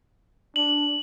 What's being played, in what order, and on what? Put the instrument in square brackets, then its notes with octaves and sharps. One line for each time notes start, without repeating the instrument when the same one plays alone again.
[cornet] D4 [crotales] F#7